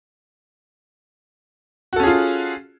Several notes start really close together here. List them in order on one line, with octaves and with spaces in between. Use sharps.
F#4 A4 C#4 G#4 F4